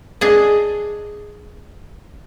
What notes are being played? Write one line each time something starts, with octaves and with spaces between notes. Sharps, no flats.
D4 G#4 D#5